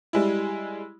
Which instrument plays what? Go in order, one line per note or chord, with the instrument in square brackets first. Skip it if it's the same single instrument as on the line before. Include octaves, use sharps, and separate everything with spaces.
[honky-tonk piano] G3 G#3 E4